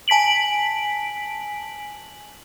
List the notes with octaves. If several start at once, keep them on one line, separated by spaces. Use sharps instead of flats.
G#5 A5 B6 D7 F#7